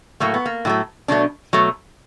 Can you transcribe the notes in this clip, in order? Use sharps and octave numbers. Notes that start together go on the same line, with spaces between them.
A2 F#3 A3 A#3
B3
A#3
A2 F#3 A3
B2 F#3 A3 D4
B2 F#3 A3